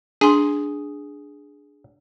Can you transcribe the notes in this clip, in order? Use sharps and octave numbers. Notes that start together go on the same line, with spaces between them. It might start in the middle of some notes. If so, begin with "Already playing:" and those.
D4 G#4 C6